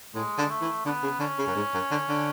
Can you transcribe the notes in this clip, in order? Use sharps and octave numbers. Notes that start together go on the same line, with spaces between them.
A2 G#3
D3
G#3
A3
E3
D3 B3
C#3
D3 C#4
C#3
F#2
G#2
F#2
D3
D3